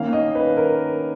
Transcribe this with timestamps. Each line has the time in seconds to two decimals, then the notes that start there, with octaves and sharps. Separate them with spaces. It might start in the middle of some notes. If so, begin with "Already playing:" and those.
Already playing: D#3 A#3 C#4 F5
0.13 D#5
0.35 B4
0.57 A#4